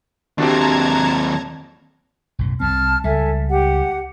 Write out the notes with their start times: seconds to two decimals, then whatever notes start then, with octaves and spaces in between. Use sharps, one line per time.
0.38 D#2 C4 D4 F#4 G4 A5 A#5 G#6
2.39 B1 F#2 A2
2.60 C2 G3 C4 A5 F6
3.04 C#2 G3 A4 E5 G#5
3.48 G4 F#5